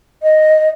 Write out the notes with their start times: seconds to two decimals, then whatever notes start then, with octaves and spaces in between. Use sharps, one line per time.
0.23 D#5